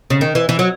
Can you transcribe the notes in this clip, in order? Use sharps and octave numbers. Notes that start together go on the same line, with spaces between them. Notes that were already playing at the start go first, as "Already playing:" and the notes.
C#3
D#3
E3
E3
F#3